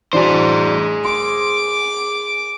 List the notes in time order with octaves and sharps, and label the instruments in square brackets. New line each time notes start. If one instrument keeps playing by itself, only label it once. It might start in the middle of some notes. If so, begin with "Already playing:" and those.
[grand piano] E3 D4 F#4 [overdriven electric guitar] G#4 C5
[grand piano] C6 [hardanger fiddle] D6